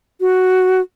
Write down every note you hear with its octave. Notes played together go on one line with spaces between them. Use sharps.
F#4